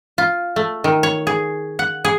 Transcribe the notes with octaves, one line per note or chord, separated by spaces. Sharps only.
F4
A3
D#3
C#5
G#4
F#5
G#4